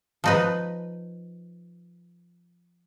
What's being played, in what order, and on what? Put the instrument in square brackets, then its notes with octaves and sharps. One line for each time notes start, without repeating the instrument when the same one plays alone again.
[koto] F3 D#4 B4